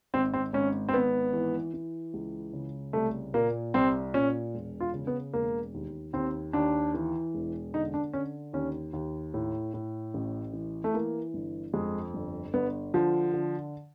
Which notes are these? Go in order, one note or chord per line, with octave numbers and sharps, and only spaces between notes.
G#1 C4
C4
G#1 C#4
C4
G#1 B3
E3
E3
C#2
C#3
C2 A3
A#2 A#3
C2 C4
A#2 C#4
E1
F4
C#3
B3
E1 A#3
D#2
D#2 C4
D#2 D4
E3
E1
D3 D#4
D4
D3 C#4
D#2 C#4
D#2
A2
A2
A1
E3
A3
E3 A#3
G1
F2 G#3
G1
G1 B3
D3 F3
D3